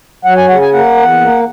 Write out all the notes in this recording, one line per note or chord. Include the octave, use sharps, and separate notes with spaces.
F#3 F#5
G#5
C#3 F#5
G#5
A#3 F#5
E2
A#3